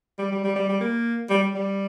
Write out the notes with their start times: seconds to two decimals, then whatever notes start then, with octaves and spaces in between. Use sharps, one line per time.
0.19 G3
0.32 G3
0.44 G3
0.56 G3
0.68 G3
0.81 A#3
1.30 G3
1.43 G3
1.55 G3